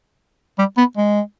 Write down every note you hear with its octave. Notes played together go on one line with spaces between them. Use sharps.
G3
B3
G#3